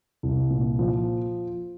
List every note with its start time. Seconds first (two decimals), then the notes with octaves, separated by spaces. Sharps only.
0.23 C2
0.50 A#2
0.79 F3